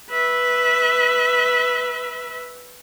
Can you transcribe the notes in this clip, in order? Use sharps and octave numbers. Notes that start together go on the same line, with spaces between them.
B4 E5